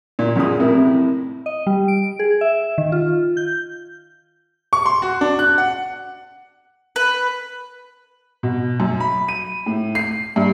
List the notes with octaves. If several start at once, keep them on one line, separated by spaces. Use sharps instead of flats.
A#2
F#2 A#2 C#3 G#3 C#4 D#6
F2 A2 C3 E4 A#4
D#5
G3
D7
G#4
E5
D#3
F4
G6
C#6
C6
F#4
D4
F#6
F#5
B4
B2
F#2
B5
D#7
A2
C7
G2